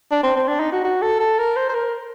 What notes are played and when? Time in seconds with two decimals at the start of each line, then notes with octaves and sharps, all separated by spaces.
0.11 D4
0.23 C4
0.36 C4
0.48 D4
0.60 D#4
0.72 F#4
0.84 F#4
1.02 A4
1.20 A4
1.38 A#4
1.56 C5
1.69 C5
1.74 A#4